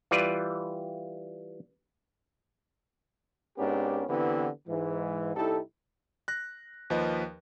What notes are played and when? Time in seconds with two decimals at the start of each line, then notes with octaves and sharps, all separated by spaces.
0.11 E3 G3 F4 B4 D5
3.58 G#2 B3 C#4 D4 G4 A#4
4.09 D3 E3 B3 C4 E4 G4
4.68 G#2 E3
5.35 C2 D#4 E4 G4 A4
6.28 F#6 A#6
6.90 D#2 F3 B4 D#5